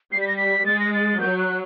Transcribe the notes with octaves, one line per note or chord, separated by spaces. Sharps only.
G3 C7
B6
A#6
B6
G#3 A6
A#6
A6
F#3 G6
F#6